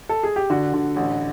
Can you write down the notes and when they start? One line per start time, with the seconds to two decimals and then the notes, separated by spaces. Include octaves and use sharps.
0.09 A4
0.23 G#4
0.36 G4
0.50 D3 F#4
0.73 D3
0.96 A1